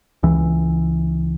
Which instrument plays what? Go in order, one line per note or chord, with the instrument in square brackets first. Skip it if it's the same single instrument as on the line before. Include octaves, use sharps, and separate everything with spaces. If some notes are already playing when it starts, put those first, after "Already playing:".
[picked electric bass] C#2 E3